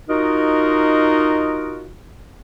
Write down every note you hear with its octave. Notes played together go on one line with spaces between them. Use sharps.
D#4 F4 F#4 A#4 D#5